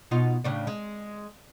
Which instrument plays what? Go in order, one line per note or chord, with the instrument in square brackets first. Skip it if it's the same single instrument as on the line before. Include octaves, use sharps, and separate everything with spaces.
[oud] B2 D#4 F4
A2 C#3 D4
G#3